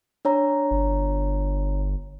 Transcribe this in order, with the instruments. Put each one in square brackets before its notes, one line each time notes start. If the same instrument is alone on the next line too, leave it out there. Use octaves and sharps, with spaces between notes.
[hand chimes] D4 C#5 A#5
[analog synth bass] G1